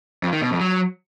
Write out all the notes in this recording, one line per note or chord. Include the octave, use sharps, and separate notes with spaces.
F2
D#3
B2
F2
F#3